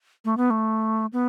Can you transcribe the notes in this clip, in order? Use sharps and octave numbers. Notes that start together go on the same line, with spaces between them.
A3
B3
A3
B3